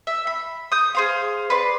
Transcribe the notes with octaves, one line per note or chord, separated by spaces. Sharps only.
E5
B5
D#6 G6
G#4 C5 F5
B4 D5 C6